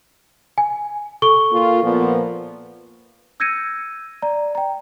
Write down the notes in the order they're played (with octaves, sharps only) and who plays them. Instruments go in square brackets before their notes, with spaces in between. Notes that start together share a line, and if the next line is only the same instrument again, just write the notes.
[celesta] G#5
A4 C#6 G7
[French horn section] A#2 F4
A#2 F3 B3
[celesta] E6 G6 G#6 A#6 C#7 D#7
D5 A#5
G5 A#5